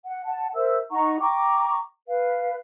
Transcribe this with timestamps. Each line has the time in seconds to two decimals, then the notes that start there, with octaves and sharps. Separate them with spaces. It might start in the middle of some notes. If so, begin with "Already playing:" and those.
0.06 F#5
0.25 F#5 A5
0.54 A#4 C5 E5 E6
0.91 D#4 F#5 A#5 C#6
1.20 G5 A#5 C#6 D6
2.08 B4 F5